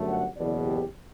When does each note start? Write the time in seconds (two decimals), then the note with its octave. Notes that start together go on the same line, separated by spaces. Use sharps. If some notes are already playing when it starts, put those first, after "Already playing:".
Already playing: G1 F#2 D3 A3
0.09 F#5
0.37 F#1 E2 B2 D5
0.65 G4